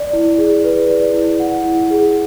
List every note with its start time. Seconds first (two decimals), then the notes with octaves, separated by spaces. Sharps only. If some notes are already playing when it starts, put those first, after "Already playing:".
Already playing: D5
0.13 E4
0.38 G#4
0.64 B4
0.90 D5
1.14 E4
1.39 F#5
1.65 E4
1.90 G#4